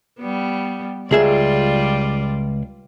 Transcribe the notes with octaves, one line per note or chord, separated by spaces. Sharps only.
G3 B3
C#2 G3 F4 G#4 D5 E5